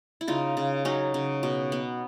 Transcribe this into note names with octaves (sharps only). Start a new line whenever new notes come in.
E4
C#3 D#4 F4
C#3
F#3 C#4 D#4
C#3
B2
B3